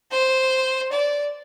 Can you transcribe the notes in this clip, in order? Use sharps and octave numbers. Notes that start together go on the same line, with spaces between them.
C5
D5